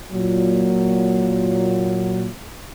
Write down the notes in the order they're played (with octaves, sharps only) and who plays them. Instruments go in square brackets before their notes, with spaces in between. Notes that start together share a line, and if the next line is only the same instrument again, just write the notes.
[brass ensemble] A#2 F#3